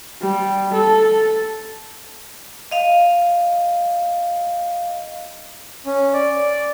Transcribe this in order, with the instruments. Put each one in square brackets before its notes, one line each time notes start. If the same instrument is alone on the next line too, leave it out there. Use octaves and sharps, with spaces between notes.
[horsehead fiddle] G3
A4
[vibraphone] D#5 F5
[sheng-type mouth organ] C#4
D5